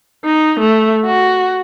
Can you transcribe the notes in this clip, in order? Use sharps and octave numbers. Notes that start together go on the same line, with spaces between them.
D#4
A3
F#4